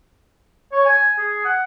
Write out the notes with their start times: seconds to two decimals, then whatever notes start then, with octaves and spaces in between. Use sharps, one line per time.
0.72 C#5
0.85 G#5
1.18 G#4
1.45 F#5